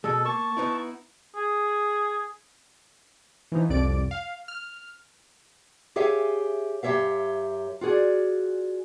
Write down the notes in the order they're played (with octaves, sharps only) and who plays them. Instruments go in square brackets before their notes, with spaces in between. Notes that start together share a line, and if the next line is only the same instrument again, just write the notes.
[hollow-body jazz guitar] B2 G#3 [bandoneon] A4
[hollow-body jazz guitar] A#3 [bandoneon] A5 C#6
[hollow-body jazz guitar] B3 D#4 E4
[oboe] G#4
[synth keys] E3 F3 D#4
C2 F2 D5 D7
F5
F6
[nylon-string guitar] G4 G#4 C#5 E5 F5 G#5
F#2 G4 C#5 E5 F5
F4 F#4 G#4 D5